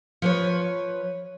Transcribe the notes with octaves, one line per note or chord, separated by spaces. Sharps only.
F3 B4 C#5